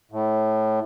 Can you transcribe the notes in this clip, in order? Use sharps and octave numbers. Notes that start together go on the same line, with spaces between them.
A2